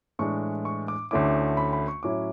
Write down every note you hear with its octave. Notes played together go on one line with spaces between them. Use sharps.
A2 E3 G#3 D4 C#6
C#6
D6
D2 D3 A3 C#4 E4 D6
B5
B5
C#6
A2 F#3 C#4 E4 D6